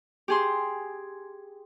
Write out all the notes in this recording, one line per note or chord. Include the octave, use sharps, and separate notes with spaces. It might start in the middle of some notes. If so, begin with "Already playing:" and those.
G4 G#4 C6